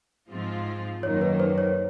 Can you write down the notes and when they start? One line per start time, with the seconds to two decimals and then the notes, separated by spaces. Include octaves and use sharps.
0.30 G#2 F3 G#3 C4 F4
1.03 F#2 D#3 F#3 A#3 C#5
1.21 B4
1.40 C5
1.58 C#5